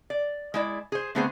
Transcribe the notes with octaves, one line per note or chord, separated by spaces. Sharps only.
D5
G#3 E4 D5
G#4 C5
D3 A3 B3 C4 G#4 C5